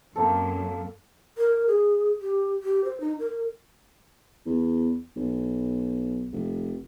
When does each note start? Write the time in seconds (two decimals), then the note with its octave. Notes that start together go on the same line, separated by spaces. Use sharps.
0.16 F#2 A#3 C4 A4
1.38 A#4
1.68 G#4
2.22 G4
2.63 G4
2.84 C5
3.00 D#4
3.19 A#4
4.46 E2
5.16 B1
6.32 F1